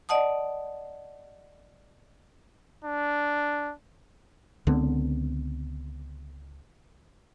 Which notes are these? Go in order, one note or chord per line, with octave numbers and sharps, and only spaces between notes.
D5 D#5 F#5 A5 D#6
D4
C#2 D3 B3 C4